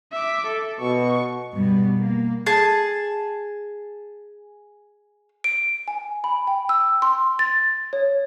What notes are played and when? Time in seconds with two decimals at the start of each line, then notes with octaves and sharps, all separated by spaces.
0.13 E5 D6
0.47 A4
0.80 B2 C#6
1.53 G2 B2 G3 B3
1.99 A#3
2.46 G#4 A5
5.44 D7
5.88 G#5
6.24 B5
6.47 G5
6.69 E6
7.02 C6
7.39 A6
7.93 C#5